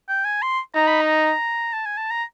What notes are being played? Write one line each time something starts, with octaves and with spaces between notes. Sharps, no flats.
G5
G#5
C6
D#4 A#5
B5
A#5
A5
G#5
A5
A#5